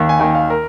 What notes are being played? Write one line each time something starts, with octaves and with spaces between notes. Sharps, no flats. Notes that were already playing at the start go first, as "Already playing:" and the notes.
Already playing: D#2 D#3
G#5
D#2 D#3 G5
F5
A#4